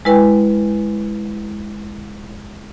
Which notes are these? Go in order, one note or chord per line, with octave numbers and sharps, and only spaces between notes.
G#3 E4 B4 G5 G#5